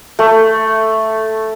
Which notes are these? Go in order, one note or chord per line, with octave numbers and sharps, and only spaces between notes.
A3